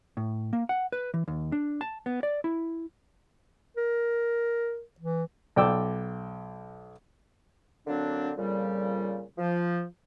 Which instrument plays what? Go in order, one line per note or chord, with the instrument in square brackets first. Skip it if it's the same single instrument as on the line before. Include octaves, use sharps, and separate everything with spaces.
[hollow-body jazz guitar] A2
A#3
F#5
B4
E3
D#2
D4
A5
B3
D5
E4
[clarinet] A#4
E3
[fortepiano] B1 D5 G5 D6 E6
[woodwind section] D3 F#3 A#3 C4 D4
F2 A#2 C#3 G3
F3